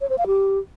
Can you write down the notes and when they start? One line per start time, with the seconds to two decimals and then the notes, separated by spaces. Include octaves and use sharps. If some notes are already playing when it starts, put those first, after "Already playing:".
0.01 C#5
0.09 C5
0.18 F5
0.27 G4